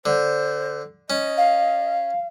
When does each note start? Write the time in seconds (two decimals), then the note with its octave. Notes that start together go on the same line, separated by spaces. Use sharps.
0.06 D3 C5
1.10 C#4 D#5
1.37 F5